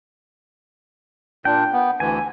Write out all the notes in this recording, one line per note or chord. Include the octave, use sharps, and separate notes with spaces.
A#2 D4 G5
B3
D2 E3 G#5